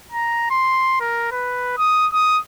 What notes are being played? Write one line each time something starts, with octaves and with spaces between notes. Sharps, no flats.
A#5
C6
A#4
B4
D#6
D#6